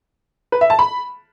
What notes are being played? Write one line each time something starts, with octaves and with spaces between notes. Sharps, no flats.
B4
E5
A5
B5